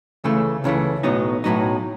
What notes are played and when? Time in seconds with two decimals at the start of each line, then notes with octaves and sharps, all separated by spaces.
0.24 C#2 C#3 E3 A3
0.64 C#2 C#3 E3 A3
1.03 B1 A2 F#3 B3 D#4
1.44 B1 A2 F#3 B3 D#4